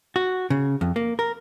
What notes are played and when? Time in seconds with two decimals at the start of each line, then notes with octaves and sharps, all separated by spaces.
0.16 F#4
0.50 C#3
0.81 F2
0.96 A#3
1.19 A#4